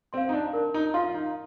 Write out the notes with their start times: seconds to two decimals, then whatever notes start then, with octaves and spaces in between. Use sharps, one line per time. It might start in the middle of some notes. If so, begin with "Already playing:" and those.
0.13 C4 C6
0.17 F5
0.29 D#4
0.33 D4
0.53 D4 A#4
0.74 D#4
0.94 F4 F5 C6
1.14 D#4